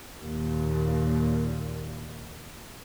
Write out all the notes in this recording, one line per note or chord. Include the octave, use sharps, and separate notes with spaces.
D#2 A#2